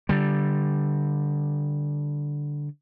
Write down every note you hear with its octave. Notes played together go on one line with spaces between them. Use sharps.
D3 G3